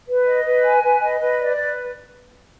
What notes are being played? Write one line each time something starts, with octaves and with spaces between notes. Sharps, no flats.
B4
D#5
B4
G#5
B4
D#5
B4
D5
B4